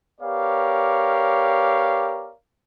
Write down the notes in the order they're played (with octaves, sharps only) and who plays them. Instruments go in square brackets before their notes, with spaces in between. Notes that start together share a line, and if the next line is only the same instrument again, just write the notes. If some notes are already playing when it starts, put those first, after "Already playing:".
[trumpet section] B3 G4 A#4 C#5 D5 F5